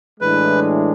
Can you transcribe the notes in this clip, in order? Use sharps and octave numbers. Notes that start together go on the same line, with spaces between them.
A2 E3 G#3 D4 B4